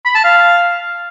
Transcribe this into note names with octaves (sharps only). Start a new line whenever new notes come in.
B5
A5
F5